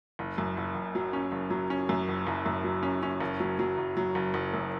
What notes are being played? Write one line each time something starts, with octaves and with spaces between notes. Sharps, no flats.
F#1
F#2
F#1
F#1
F#3
C#4
F#1
F#3
C#4
F#2
F#1
F#1
F#2
F#3
C#4
C#4
F#1
F#3
F#3
F#1
F#3
F#1
F#1
F#2